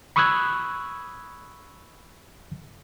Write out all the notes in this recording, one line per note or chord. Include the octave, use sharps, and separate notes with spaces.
B5 C#6 D#6 E6 F#6 G#6